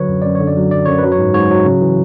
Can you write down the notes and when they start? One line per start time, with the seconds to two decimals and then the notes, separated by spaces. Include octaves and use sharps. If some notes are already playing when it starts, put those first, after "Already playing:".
Already playing: D3 F#3 B4 C#5
0.09 F#2
0.22 F#2 D5
0.35 C#5
0.41 D3
0.47 D5
0.56 F#3
0.71 F#2 D5
0.85 F#2 C#5
0.98 B4
1.04 F#3
1.12 C#5
1.18 G#2
1.34 G#2 C#5
1.50 F#3
1.66 C#3
1.81 E3